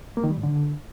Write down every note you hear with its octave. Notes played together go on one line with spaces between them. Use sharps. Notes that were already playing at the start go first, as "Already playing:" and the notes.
A#3
D#3
G3
A2
D3